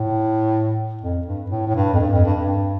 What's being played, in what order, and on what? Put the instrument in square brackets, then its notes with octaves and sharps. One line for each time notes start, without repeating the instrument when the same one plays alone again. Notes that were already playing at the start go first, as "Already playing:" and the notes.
Already playing: [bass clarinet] A2
F2
G2
A2
A2
G2
F2
G2
F2
G2
G2